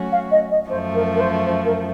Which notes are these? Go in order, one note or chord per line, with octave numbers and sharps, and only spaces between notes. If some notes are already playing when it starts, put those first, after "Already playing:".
Already playing: F#3 A3 C#4 F#4
F5
D#5
D#5
F#2 F3 A3 C5
A#4
A#4
C5
C5
A#4